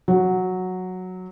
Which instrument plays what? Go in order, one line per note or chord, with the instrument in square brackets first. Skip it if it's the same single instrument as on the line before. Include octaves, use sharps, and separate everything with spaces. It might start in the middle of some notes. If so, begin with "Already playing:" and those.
[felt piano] F#3